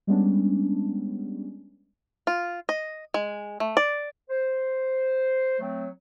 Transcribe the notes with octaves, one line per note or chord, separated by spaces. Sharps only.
G3 G#3 B3 C#4 D4
F4
D#5
G#3
A3
D5
C5
F#3 A3 C4